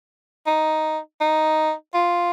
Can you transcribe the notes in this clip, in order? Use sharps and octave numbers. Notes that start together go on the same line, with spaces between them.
D#4
D#4
F4